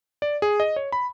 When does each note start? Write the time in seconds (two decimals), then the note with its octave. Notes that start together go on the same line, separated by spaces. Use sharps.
0.22 D5
0.42 G#4
0.60 D#5
0.76 C#5
0.92 B5